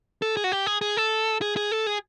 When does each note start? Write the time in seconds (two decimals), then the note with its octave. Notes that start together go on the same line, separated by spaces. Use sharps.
0.22 A4
0.37 G#4
0.44 F#4
0.52 G4
0.66 G#4
0.81 G#4
0.97 A4
1.42 G#4
1.56 G#4
1.72 A4
1.87 G#4